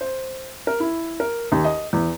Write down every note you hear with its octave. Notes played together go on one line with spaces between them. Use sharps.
C5
A#4
E4
A#4
D#2
D#5
E2